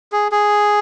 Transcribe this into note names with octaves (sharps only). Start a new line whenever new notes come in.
G#4
G#4